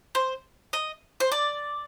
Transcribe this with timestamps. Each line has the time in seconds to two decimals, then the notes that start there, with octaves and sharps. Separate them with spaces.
0.15 C5
0.73 D#5
1.20 C5
1.32 D5